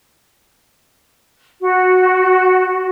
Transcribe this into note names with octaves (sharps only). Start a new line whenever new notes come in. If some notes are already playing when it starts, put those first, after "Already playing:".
F#4